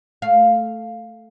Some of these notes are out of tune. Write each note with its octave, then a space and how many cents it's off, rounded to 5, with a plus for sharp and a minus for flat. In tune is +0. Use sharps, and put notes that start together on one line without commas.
A3 +0 F5 +0